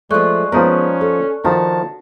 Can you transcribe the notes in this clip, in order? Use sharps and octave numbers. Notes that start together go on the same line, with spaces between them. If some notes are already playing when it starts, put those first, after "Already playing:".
F3 G#3 A3 D5 C#6 F#6
F3 G#3 B3 C#4 D#4 A#4
A4
D#3 F3 D4 F#4 A5